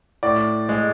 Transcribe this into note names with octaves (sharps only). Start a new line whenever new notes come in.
A2 D5
G#3